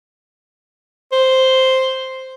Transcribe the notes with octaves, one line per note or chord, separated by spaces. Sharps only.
C5